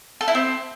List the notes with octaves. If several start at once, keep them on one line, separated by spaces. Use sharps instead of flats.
A4
E4
C4